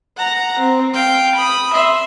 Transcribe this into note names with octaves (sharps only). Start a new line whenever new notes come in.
F#5 A#5
C4
F5 G5
B5 D#6
E5 C6